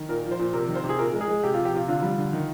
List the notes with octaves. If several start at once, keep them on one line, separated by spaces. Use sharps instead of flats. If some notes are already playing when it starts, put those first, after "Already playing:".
Already playing: D#3
A#2 A#4
F3
C5
A#2
C3 A#4
D#3
C5
C3
G#4
A#2 A#4
G#3
G#4
G#3
C3 G4
F3 F4
G4
C3 F4
D3 F4
G3
D3
D#3